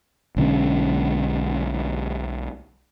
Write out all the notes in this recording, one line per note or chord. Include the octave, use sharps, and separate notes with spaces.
B1 D3 G#3 C#4